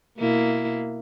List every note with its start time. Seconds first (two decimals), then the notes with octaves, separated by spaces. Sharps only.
0.18 B2 A#3 E4